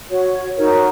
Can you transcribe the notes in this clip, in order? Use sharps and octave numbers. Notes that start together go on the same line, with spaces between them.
F#4 C#5
D#4 F#4 A#4 C#5